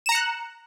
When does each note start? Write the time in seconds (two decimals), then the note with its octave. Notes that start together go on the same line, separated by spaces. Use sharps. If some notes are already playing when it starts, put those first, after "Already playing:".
0.06 E7
0.09 A#5
0.12 C#7
0.15 F#6